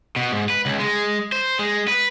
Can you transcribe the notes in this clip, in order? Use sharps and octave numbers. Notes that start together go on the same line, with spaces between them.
B2
G#2
B4
C#2
G#3
C5
G#3
B4